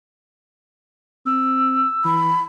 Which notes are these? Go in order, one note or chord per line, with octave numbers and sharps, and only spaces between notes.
C4 E6
E3 B5